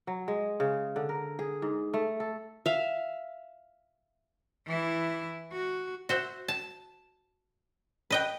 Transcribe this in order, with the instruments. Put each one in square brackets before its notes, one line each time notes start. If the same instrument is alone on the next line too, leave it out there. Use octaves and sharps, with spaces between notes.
[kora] F#3
G#3
C#3
D3
A#4
G#4
G#2
A3
A4
[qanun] E5 F5
[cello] E3 E4
F#4
[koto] F#4 C5 E5
A5
B4 D#5 G5